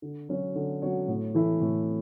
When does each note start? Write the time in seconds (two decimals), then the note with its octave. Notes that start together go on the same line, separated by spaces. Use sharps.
0.02 D3
0.29 F#3 C#4 F#4 C#5
0.55 D3
0.82 F#3 C#4 F#4 C#5
1.08 A2
1.35 E3 A3 E4
1.61 A2